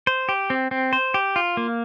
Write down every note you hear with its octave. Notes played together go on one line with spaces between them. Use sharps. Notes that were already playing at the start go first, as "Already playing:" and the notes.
C5
G4
C4
C4
C5
G4
F4
A#3